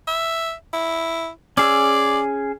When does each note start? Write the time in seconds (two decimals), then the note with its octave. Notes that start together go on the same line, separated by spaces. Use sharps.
0.08 E5
0.74 E4
1.57 C#4 G#4 D5 E6